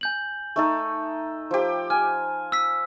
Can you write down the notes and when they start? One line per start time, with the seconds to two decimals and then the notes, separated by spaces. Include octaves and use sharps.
0.01 G#5 G6 F#7
0.56 A3 D#4 A4
1.51 F3 G4
1.90 G#5 F6
2.52 E6 B6